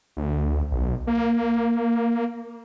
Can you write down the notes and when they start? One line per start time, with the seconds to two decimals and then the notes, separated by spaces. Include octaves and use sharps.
0.17 D2
0.72 B1
1.07 A#3